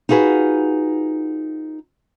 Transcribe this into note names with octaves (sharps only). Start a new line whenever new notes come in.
D#4 F4 F#4 G#4 B4